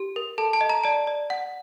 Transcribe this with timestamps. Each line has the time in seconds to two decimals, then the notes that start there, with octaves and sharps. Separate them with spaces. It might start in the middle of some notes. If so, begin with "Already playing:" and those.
Already playing: G4
0.16 A#4
0.38 A4 A5
0.53 A5
0.61 D#5
0.70 A#5
0.84 D5 A5
1.07 D5
1.30 F#5